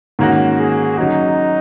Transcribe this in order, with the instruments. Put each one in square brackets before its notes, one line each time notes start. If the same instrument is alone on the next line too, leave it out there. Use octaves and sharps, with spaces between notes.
[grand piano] G#2 D#3 A#3 C#4 F#4
[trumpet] G#4
[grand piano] F#3 C#4 F#4 [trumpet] D#4